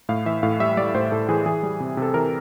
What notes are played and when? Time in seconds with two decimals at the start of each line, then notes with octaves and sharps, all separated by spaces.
0.09 A2 F5
0.26 E3 E5
0.43 A2 F5
0.60 G3 E5
0.77 G3 D5
0.94 A2 C5
1.12 A2 A4
1.29 E3 G#4
1.46 E3 G#4
1.63 G3
1.80 C3
1.97 C3 A4
2.14 E3 A#4